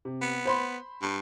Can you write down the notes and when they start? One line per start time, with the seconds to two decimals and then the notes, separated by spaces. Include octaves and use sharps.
0.05 C3
0.21 B3
0.45 C5 B5 C6
1.02 G2